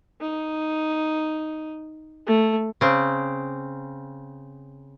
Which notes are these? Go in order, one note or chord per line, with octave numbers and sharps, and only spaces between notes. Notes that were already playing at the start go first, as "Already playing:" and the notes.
D#4
A3
C#3 C4